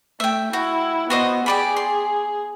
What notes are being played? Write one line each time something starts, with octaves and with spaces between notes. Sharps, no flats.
A3 E5 G5
E4 F#4
B3 F#4 C5 D#5
G4 G#4 D5 B5
C6